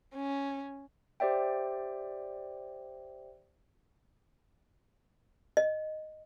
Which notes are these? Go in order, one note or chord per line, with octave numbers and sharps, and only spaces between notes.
C#4
G4 C5 D5 E5 G5
D#5